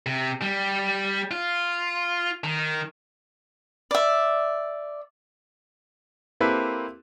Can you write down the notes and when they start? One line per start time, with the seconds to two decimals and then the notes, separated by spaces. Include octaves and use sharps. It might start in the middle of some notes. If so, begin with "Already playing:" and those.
0.06 C3
0.42 G3
1.31 F4
2.44 D#3
3.91 D5 E5
6.40 A#3 C4 E4 G4 A4 B4